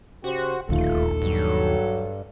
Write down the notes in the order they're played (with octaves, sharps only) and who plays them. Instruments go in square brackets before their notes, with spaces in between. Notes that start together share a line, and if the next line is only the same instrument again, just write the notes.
[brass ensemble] C#3 G4 C5 [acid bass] F#4
[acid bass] D1 [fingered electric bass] A#1 D#2 D#3 [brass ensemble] A3 F4 [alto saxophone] A4
[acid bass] G2 [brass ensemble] F#3